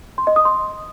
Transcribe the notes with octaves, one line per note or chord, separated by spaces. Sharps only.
C6
D#5
D#6
C6